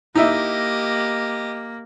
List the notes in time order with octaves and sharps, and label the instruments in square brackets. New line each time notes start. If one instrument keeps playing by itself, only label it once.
[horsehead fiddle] A#3 [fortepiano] D#4 E4 E5 [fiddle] G4 D#5